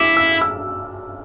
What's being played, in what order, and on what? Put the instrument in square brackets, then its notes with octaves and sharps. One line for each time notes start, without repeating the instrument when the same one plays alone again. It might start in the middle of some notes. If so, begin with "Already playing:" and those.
Already playing: [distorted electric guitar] E4 [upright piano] D6 E6
[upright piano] E6
E6